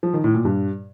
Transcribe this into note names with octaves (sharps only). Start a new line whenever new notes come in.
F3
D#3
A2
A#2
G2